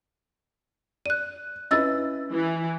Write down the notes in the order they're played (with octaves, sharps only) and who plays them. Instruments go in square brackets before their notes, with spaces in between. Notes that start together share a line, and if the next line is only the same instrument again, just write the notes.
[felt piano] D5 [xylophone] F#6 D#7
[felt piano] C#4 E4 B4 [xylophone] D#5 E6 A6
[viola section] E3